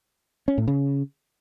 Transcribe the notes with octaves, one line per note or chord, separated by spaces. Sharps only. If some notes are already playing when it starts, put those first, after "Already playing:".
C#4
A2
C#3